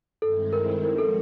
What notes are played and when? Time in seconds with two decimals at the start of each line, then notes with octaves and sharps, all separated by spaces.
0.21 G2 D#3 G#3 C4 E4 A4
0.53 A#4
0.83 F3 G#3 C#4 F#4 A#4
0.99 A4